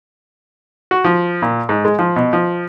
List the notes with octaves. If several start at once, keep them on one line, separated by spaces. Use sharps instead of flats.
F#4
F3
A#2
G#2
G#3
F3
B2
F3